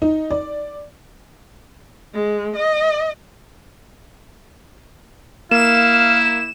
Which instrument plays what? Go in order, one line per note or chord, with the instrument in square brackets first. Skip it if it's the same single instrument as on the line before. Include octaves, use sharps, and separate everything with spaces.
[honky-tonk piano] D#4
D5
[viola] G#3
D#5
[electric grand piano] A#3 [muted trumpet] E4 [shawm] F5 [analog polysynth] E7